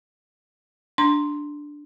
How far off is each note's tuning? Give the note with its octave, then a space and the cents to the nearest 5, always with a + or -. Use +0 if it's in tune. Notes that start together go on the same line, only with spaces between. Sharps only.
D4 +0 C6 +0